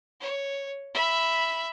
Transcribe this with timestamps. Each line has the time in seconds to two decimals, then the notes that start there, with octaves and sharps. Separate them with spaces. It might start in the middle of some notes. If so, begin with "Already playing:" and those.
0.20 C#5
0.94 E5 B5